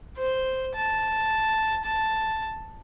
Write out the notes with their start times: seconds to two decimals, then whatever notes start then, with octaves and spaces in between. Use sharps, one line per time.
0.18 C5
0.75 A5
1.85 A5